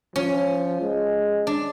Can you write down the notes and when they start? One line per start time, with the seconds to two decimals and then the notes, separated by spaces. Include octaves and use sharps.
0.15 F3 C#4
0.82 G#3
1.47 D4